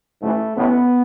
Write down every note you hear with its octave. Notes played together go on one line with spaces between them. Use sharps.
A1 G#2 E3 A3
A1 A2 E3 B3